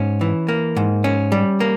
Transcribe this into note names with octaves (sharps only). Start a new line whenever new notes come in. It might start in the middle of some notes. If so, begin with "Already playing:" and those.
Already playing: G#2 C#4
E3
A#3
G#2
C#4
G3
A#3